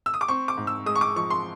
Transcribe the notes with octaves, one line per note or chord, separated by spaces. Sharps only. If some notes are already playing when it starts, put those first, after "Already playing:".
E6
D#6
D6
C4 C#6
D6
G#2
E6
G#3 D#6
C#6
D6
F3 C#6
C6